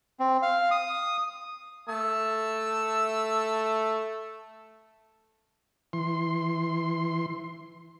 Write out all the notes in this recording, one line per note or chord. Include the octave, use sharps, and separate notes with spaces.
C4
F5
D#6
A3 A5 E6
E3 C6